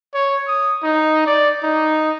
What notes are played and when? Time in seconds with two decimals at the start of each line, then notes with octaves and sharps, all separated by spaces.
0.14 C#5
0.48 D#6
0.83 D#4
1.27 D5
1.64 D#4